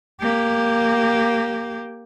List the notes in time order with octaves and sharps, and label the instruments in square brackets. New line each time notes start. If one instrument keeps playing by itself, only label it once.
[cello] A#3 G4